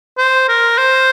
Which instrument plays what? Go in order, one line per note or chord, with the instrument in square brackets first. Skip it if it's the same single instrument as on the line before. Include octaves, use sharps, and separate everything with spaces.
[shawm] C5
A#4
C5